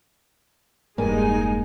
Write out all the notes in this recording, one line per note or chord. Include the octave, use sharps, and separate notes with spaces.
E1 G2 G3 G#3 A#3 D#4 G#5